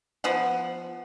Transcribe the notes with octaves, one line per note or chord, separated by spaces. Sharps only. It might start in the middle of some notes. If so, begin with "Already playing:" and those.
F3 B3 F#5